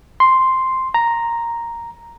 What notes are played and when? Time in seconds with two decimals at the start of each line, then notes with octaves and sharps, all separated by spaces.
0.20 C6
0.94 A#5